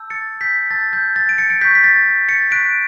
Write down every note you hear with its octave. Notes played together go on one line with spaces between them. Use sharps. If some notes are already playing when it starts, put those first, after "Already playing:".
Already playing: A5 E6 G6
A6 C#7
G6 B6
A5 E6 G6 A6
G6
A6
D7
A6 C#7
C#7
C#6 F#6 G6 B6
B6
A6
A6 C#7
C#6 F#6 B6 D7